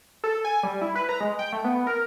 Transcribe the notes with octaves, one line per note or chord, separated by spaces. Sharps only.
A4
G#5
G3
E4
B4
A#5
G#3
G5
A3
B3
A#4